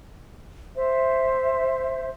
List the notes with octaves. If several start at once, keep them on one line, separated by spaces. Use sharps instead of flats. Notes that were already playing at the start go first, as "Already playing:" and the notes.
C5 E5